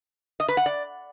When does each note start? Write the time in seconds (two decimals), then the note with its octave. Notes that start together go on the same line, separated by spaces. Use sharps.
0.40 D#5
0.48 B4
0.57 F#5
0.66 D5